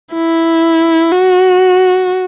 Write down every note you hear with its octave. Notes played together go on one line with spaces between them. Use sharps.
E4
F#4